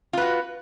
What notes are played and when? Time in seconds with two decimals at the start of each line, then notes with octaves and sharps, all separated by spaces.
0.13 F4
0.17 B4
0.22 F#4